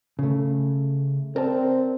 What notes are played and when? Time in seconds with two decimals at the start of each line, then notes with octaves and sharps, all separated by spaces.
0.19 C#3 A3
1.36 C4 A#4 D5 A5